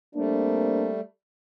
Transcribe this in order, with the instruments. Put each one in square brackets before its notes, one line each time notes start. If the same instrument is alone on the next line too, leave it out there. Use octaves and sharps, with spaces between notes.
[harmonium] G3 A3 [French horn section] A#3 C4 D4